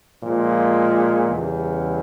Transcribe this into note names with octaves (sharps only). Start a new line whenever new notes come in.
A#2 F3 G#3
E2 C#3 G3